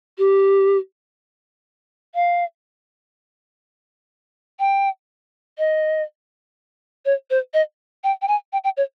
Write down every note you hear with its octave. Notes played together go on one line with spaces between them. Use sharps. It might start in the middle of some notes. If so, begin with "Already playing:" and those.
G4
F5
G5
D#5
C#5
C5
D#5
G5
G5
G#5
G5
G5
C#5